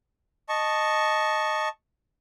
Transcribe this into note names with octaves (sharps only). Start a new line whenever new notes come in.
D#5 A5 C#6